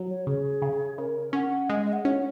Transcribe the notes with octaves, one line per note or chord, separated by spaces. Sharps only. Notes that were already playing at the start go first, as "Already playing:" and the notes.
Already playing: F#3
C#5
C#3 G#4
C#3
C#3 A#4
C#4 F#5
G#3 D#5
D#5
F#5
C#4